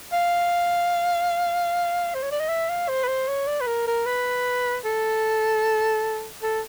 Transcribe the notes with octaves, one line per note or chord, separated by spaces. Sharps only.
F5
C5
C#5
D5
D#5
E5
F5
C5
B4
C5
C#5
D5
B4
A#4
A#4
B4
A4
A4